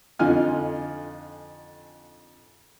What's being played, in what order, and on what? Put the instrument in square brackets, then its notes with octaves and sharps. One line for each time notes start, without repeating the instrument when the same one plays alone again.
[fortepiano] F2 D3 D#4 F4 G#5 F6